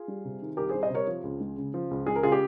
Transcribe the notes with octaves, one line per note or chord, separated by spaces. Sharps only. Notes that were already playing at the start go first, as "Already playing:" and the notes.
Already playing: F4 G#4
G3
C3
D#3
C2 G4 A#4
G#4 C5
G3
C5 D#5
C3 A#4 C#5
F3
C#2
G#3
C#3
F3
C#2
G#3 G#4
A#4
C#3 F4 G#4
G4